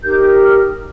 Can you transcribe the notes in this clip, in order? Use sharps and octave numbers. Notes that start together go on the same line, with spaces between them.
D#4 G4 A#4 G6
F6